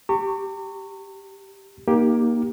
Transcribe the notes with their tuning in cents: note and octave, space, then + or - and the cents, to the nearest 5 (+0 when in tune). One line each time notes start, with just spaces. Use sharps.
G4 +0 A#5 -40 C#6 +0
A#3 +20 D#4 +0 G4 +0